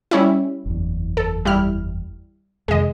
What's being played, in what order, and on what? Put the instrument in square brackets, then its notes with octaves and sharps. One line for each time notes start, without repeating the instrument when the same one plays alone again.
[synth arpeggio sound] G3 C#4 E4
[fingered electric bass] F#1 E2
[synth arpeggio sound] A4
G3 E4 F6
[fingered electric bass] F2 C3 D#3 [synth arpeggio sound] G#3 D#5